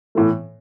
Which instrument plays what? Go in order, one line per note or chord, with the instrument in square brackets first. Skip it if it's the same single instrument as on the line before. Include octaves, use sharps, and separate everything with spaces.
[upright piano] A2 E3 A3